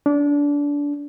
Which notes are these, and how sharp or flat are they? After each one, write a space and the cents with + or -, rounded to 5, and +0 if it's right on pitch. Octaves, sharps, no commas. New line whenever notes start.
D4 -25